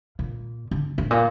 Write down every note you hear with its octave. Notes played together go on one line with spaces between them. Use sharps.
A#2
D3
A2
A#2